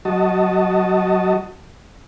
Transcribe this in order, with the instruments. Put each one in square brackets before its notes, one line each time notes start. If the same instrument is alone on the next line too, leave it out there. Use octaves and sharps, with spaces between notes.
[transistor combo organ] F#3 F#4 D#5 A5